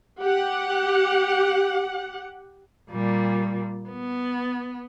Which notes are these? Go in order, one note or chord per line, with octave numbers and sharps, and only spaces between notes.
G4 F#5
A#2 G3
B3